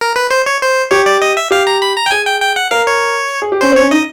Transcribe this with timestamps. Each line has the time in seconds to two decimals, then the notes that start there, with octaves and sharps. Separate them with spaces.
0.01 A#4
0.16 B4
0.30 C5
0.46 C#5
0.62 C5
0.91 G4 C#5
1.06 D5
1.22 D#5
1.37 E5
1.51 G4 F5
1.67 A#5
1.82 B5
1.96 A#5
2.06 G5
2.11 G#4 G#5
2.26 G5
2.41 G5
2.56 F#5
2.71 A#4 F5
2.87 C#5
3.42 G#4
3.52 G4
3.61 C#4 C5
3.72 C4
3.76 C#5
3.82 C#4
3.91 D#4 D#5